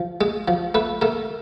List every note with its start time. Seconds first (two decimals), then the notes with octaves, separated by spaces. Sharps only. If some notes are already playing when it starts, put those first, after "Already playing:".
Already playing: F3
0.21 G#3
0.48 F3
0.74 A3 B4
1.01 A3 A#4